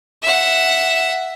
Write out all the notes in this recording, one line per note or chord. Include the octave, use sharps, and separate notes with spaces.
E5 F#5